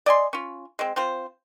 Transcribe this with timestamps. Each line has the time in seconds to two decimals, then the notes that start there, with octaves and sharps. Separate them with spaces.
0.06 D5 D#5 G#5 C6
0.33 C#4 F4
0.79 G#3 C4
0.96 C4 F4 C5